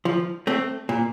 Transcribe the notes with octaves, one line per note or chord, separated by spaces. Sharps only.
F3
A3 C4
A#2